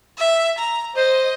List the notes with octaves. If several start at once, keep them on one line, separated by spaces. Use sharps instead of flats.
E5
A#5
C5 D#5